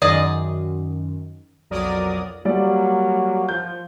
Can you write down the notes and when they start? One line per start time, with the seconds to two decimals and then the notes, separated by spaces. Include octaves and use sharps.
0.02 F#2 D#3 G#4 D5 D#5
1.70 B1 F2 F#3 A#4 D5 D#6
2.45 F#3 G3 A#3 D5
3.49 F3 G6